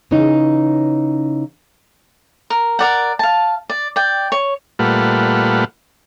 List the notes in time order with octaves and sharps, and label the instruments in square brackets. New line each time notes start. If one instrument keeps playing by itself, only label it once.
[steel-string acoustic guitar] C#3 E3 C#4 D#4
[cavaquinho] A#4
A#4 D5 F#5
F5 A5
D5
D5 G5
C#5
[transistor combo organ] A#2 G3 A3 F4 B4 F#5